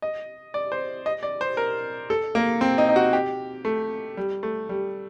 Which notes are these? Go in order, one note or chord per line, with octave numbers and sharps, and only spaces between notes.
D#5
D5
C5
D#5
D5
C5
A#4
A4
A#3
C4
D#4
D#4
F#4
G4
A3
G3
A3
G3